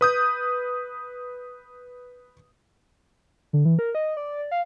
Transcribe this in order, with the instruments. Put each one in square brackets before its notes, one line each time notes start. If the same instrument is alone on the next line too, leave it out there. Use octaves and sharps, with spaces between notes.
[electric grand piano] B4 D#6 G6
[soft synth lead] D3
E3
A#4
D#5
D5
F5